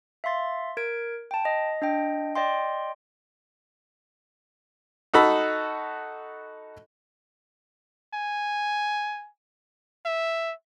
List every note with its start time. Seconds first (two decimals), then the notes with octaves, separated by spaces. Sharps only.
0.24 E5 F5 C6 A6
0.77 A#4 G#6 D7
1.31 G5 A5
1.45 D#5
1.82 D4 D#5 G5
2.35 D5 D#5 G5 C6
5.14 D#4 F#4 A4 B5
8.13 G#5
10.05 E5